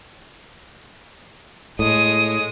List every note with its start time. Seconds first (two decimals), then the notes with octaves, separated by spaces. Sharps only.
1.79 A2 G#3 D#6